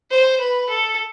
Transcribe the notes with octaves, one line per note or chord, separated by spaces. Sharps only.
C5
B4
A4